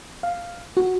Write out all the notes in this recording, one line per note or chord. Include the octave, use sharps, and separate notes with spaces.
F5
F#4